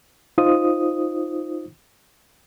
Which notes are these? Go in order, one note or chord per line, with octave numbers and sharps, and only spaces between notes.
D#4 F4 C5 D#6